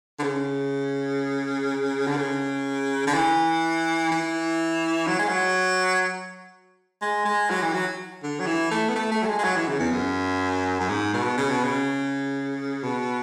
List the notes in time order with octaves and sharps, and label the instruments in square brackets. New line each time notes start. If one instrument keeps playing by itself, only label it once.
[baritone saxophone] D3
C#3
D3
C#3
D3
E3
E3
F#3
G#3
F#3
G#3
G#3
F#3
E3
F#3
D3
F#3
E3
A3
B3
A3
A3
F#3
G#3
G#3
F#3
E3
C#3
E2
F#2
F#2
G#2
B2
C#3
B2
C#3
B2